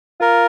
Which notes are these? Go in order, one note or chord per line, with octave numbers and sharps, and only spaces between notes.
F4 A#4